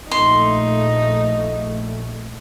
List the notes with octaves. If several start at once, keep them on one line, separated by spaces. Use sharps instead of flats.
A#1 A3 D#4 C6